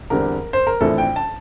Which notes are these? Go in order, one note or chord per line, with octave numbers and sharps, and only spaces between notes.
E2 D3 G3 C4 A#4
C5
A#4
A#1 A2 E3 A3 C4 A4
G5
A5